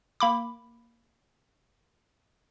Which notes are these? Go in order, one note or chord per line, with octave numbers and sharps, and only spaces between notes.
A#3 B5 D6